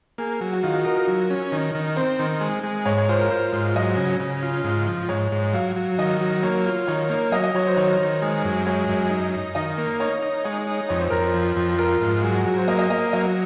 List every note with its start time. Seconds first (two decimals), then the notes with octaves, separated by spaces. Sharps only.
0.18 A#3 G#4
0.41 F#3
0.53 F#4
0.63 D#3 F4
0.73 F#4
0.85 D#4 A#4
0.96 A#4
1.08 F#3
1.30 C#4
1.52 D#3
1.75 D#3
1.96 C4 C5
2.19 D#3
2.41 G#3
2.64 G#3
2.85 G#2 C#5
2.97 C#5
3.09 F4 C5
3.19 A#4
3.30 F4 C5
3.53 G#2
3.75 F#3 D#5
3.97 C#3
4.20 C#3
4.43 F4
4.64 G#2
4.87 F3
5.09 G#2 C#5
5.32 G#2
5.53 F#3 F5
5.76 F#3
5.99 D#3 D#5
6.21 F#3
6.43 A#3 C#5
6.66 F4
6.87 D#3 C#5
7.10 A#3
7.32 F#3 D#5
7.44 D#5
7.55 F#3 C#5
7.66 C5
7.77 D#3 C#5
8.00 D#3
8.22 G#3
8.44 F#2
8.66 G#3 C#5
8.89 F#2
9.10 D#4
9.34 D#4
9.55 D#3 D#5
9.78 A#3
10.00 D#4 C#5
10.22 D#4
10.45 G#3 C#5
10.67 D#4
10.89 F2 C#5
10.99 C5
11.10 F2 A#4
11.20 C5
11.34 F3
11.56 F2
11.78 F4 A#4
12.02 G#2
12.23 F#3 G#4
12.35 F#4
12.46 F#3
12.57 C5
12.68 A#3 D#5
12.79 D#5
12.90 A#3 D#5
13.13 F#3 D#5